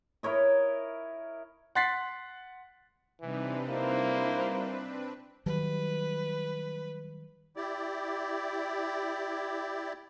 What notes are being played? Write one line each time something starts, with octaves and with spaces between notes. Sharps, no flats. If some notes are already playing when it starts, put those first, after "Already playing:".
E4 A#4 C#5 D#5
F#5 C6 F#6 A6 B6 C7
C3 E3 G3 C4 D4 D#4 B4
A#3 E4 C5
D#3 F#3 G3 B4
E4 G4 D5